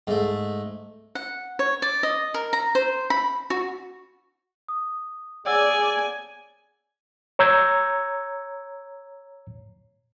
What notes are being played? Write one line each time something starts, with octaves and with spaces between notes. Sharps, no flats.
G#2 A3
F#5
C#5
D5
D#5
A#4
A#5
C5
B5
F#4
D#6
G#4 C#5 D5 F#5 G#5 E6
C#5 A#5 E6 G6 G#6